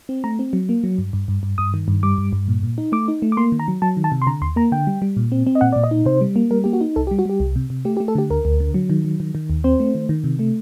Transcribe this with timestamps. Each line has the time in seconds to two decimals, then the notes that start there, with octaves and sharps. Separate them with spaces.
0.09 C4
0.24 A3 A#5
0.39 C4
0.53 F#3
0.69 A#3
0.84 F#3
0.98 G2
1.13 G2
1.28 G2
1.43 G2
1.58 G2 D#6
1.74 D#3
1.88 G2
2.03 G3 D6
2.18 G2
2.33 G2
2.48 A#2
2.63 A#2
2.78 D#4
2.92 A3 D6
3.08 D#4
3.22 A3
3.32 D6
3.37 A#3 C6
3.52 D#3
3.59 A#5
3.68 F#3
3.82 F#3 A5
3.97 D#3
4.04 A5
4.12 C3
4.22 C6
4.27 D3 A#5
4.42 D#2 C6
4.56 A#3 A#5
4.72 D3 G5
4.87 G3
5.02 G3
5.17 A#2
5.32 C4
5.47 C4
5.55 D#5
5.61 A#2 F#5
5.73 A#2 D5
5.84 D#5
5.91 D#4
6.06 C3 C5
6.21 G3
6.36 A#3
6.51 G3 A#4
6.64 A#3 G4
6.73 F#4
6.81 D#4
6.96 C2 A4
7.07 G4
7.11 G3
7.19 F#4
7.25 G3 G4
7.40 C2
7.56 C3
7.70 C3
7.85 A3 G4
7.97 G4
8.00 A3
8.08 A4
8.15 D3 G4
8.30 D2 A#4
8.45 D2
8.60 D3
8.74 F#3
8.90 D#3
9.05 F#3
9.20 D#3
9.35 D#3
9.50 D#2
9.64 C4 C5
9.80 A3
9.95 D#3
10.09 D#3
10.24 C3
10.39 A3